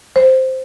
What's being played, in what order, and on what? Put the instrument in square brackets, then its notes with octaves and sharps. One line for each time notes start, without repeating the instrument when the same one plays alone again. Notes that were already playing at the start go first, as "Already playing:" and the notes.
[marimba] C5